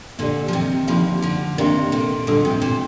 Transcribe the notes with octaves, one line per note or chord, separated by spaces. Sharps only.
A#2 D3 A#3 D4 G4 D5
F3
C3 D#3
D3 F3 A#3 D#4 G4 D5
D3 F3
C3 D#3 A#3 D4 G4 A#4 D5
A#2 D3
A#2 D3 G3 D4 A4
C3
A#2